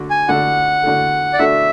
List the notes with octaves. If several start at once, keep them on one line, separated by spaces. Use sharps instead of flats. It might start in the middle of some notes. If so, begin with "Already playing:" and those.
Already playing: D3 A3 D4 F#4
G#5
D3 A3 D4 F#4 A4 F#5
D3 A3 D4 F#4 A4
D5
D3 A3 D4 F#4 A4 E5